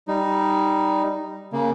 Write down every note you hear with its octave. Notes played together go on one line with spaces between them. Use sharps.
G3 D#4
C#3 A#3